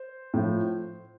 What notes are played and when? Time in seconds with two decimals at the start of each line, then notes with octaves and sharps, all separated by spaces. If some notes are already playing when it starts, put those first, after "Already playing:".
Already playing: C5
0.34 A2 F3